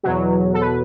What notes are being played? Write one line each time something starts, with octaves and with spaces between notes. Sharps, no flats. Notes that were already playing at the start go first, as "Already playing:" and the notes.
E2 B2 F#3
A4
B4